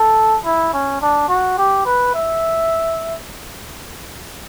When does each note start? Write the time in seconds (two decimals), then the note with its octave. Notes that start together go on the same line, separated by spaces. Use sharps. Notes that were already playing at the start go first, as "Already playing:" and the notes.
Already playing: A4
0.45 E4
0.74 C#4
1.01 D4
1.29 F#4
1.58 G4
1.86 B4
2.15 E5